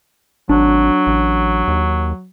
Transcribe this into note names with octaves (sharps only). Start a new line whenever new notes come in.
G#1 F#3 D4
A1
D#2